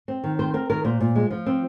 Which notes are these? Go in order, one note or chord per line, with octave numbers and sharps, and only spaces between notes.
C4
D#3
C4 C5
C4 A#4
D#3 A#4
A#2 C5
A#2
G#3
F3
C4